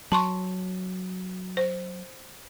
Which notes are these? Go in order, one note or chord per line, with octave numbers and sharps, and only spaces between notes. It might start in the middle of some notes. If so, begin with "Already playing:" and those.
F#3 A5 C6 C#6
C5